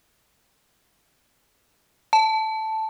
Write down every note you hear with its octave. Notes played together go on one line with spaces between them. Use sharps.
A5